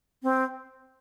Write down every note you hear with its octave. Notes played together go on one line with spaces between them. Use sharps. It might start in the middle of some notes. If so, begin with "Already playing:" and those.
C4